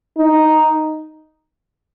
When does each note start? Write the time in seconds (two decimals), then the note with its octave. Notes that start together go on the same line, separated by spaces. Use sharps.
0.18 D#4